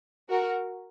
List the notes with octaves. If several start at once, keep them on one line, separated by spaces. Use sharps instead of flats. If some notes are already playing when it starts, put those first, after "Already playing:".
F#4 A#4